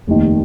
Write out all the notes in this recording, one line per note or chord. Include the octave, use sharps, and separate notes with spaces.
F1 D#2 D#3